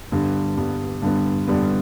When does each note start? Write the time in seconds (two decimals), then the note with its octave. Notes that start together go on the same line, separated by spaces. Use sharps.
0.12 G2 D3 G3 B3
0.57 G2 D3 G3 B3
1.02 G2 D3 G3 B3
1.48 G2 D3 G3 B3